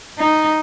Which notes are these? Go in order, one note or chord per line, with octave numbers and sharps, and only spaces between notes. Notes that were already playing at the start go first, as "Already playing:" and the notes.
D#4